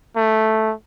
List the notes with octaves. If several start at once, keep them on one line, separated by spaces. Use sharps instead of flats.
A3